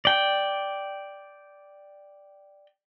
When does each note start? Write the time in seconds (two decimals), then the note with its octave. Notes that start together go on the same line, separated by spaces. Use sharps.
0.05 D5 G5